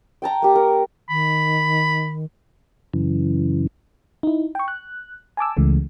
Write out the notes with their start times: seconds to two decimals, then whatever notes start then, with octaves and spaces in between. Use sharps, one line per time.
0.22 G5 A5 A#5
0.42 A#3 G4
0.56 A#4 C#6
1.09 D#3 B5
2.93 F#2 C#3 E3
4.23 D#4 E4
4.55 G5 C#6
4.68 F#6
5.37 G#5 A5 D6 E6
5.57 C#2 C#3 E3 G#3 A3